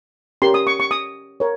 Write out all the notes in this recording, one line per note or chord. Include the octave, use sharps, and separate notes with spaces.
C#4 G4 A#4 C6
D#6
C#6
C#6
D#6
A#4 C#5